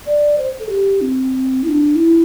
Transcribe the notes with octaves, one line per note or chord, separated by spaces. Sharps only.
D5
C5
A4
G4
C4
E4
D4
E4